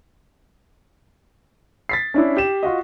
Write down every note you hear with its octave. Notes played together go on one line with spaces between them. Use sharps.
A6 B6 C7
C#4 D4 E4
G4 E7
F4 F#4 D#5